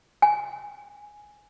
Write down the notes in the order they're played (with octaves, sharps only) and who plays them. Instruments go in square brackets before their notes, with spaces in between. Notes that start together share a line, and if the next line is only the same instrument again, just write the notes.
[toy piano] G#5